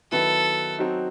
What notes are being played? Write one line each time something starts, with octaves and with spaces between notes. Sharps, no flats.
D#3 F#3 B3 E4 A4 B4
F#3 C4 D#4 F#4